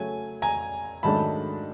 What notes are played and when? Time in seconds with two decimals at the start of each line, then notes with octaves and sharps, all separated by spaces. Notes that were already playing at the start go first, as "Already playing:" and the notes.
Already playing: C#3 F#3 A3 C#4 G#5
0.42 G#5 A#5
1.03 G#2 D#3 F#3 A3 D4 A5 B5